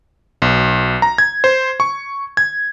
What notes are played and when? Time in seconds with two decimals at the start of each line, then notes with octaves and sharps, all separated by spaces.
0.42 B1
1.02 A#5
1.18 G#6
1.44 C5
1.80 C#6
2.37 G#6